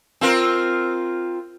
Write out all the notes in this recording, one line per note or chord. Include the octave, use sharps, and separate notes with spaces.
C4 F4 A#4